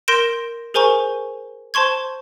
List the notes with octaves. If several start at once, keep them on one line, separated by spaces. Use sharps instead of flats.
A#4 C6 G6 A#6 D7 E7
G#4 A#4 C5 G#5 A#5 C#6
C5 A5 C6 C#6 G#6